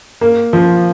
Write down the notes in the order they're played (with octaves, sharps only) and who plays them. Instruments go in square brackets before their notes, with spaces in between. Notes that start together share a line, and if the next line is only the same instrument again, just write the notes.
[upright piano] A#3
F3